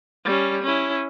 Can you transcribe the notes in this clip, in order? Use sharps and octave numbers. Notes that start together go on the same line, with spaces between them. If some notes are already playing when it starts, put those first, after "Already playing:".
G3 C#4
C#4 E4